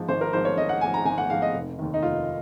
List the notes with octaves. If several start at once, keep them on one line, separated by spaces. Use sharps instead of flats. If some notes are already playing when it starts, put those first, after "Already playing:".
Already playing: G#2 F3
G#1 C5
A#4
G#2 F3 C5
C#5
G#1 D#5
F#5
G#2 F3 G#5
A#5
G#1 G#5
F#5
G#2 F3 F5
D#5
F1
D#2 D#3
D#4
F1 F4